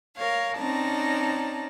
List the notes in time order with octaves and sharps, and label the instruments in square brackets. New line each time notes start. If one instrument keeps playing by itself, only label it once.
[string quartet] A#4 C#5 F5
C4 C#4 D#4 D5 A5 A#5